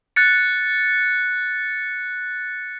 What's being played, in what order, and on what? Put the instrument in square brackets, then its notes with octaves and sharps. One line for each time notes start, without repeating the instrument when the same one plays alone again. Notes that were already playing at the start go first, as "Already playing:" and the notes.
[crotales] F#6 A6 C#7